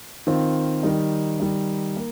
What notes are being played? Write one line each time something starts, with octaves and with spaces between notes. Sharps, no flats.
D#3 C4 F4
D#3 G3 D#4
D#3 G3 D#4
A#3